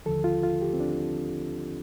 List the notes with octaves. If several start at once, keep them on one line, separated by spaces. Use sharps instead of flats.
D#2 D3 F3 A4
F4
F4
G4
C4
D4